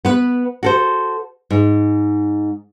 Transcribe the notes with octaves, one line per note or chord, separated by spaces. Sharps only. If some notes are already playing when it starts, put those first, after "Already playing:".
B3 B4
F#4 A4 C5
G#2